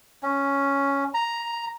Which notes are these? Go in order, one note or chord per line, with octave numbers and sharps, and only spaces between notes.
C#4
A#5